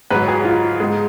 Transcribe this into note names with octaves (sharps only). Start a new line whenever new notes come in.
G#2 F#3 B4
G#4
F4
G#2 G#3